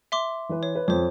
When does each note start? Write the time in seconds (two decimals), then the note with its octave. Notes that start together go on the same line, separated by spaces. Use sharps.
0.12 E5 C6 D6
0.49 E3 B4
0.63 C#5
0.75 B4
0.88 F2 C5 C#5